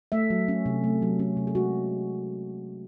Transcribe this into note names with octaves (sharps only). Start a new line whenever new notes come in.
A3 E5
F#3
C#4
C3
A3
F#3
C#4
C3
G#4
G#3 F#4